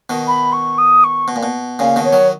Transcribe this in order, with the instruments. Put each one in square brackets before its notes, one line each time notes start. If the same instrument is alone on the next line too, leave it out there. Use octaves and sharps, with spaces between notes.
[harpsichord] B2 D#3
[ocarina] B5
C#6
D#6
C#6
[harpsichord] B2
A#2
B2
[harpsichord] A#2 C#3 [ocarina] F5
[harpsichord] B2 D#3
[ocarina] C#5
[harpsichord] D#3 F#3